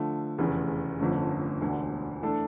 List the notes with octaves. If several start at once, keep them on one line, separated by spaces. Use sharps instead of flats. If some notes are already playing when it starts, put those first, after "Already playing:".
Already playing: D3 F3 A3
F1 E2 C#3 E3
G1 F2 D3 A3 C#4
E1 D2 D3
E3 A3 D4 A4